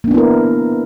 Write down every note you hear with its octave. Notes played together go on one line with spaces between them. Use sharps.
A#3 B3 D4 E4 A#4